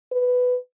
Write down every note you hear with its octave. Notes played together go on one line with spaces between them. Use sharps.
B4